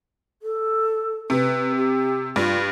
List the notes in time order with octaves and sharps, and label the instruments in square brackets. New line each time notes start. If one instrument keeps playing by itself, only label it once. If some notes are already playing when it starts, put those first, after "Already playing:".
[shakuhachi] A4
[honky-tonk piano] C3 [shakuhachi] B4
[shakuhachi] G4
[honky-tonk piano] G2 [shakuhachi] F4